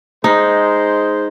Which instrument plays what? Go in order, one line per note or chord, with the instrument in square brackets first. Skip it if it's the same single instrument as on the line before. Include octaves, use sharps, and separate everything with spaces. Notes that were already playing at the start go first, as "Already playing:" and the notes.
[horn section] G#3 C5 [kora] D#4